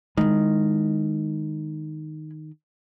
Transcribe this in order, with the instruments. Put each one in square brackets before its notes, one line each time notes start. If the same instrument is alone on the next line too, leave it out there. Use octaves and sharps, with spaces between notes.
[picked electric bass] D#3 [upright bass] G#3 E4